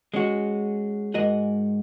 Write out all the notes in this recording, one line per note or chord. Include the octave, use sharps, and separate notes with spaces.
G#3 C#4 F#4
G#2 G#3 F#4 A#4 D#5